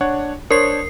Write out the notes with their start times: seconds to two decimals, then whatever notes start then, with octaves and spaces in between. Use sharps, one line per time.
0.01 D4 C#5 F#5
0.51 D4 A#4 C5 C#5 C7